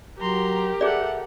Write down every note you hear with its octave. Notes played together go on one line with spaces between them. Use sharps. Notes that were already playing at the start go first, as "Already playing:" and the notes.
F#3 G4 A#4 A#5 C6
G#4 A4 D5 E5 F#5